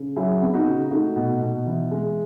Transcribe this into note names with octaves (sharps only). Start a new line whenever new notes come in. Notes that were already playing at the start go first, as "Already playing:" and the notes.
Already playing: C#3
F#3 E4 G#4
B3
D#4 F#4
C#3
A3 D#4 F#4
B2
B2
E3
G#3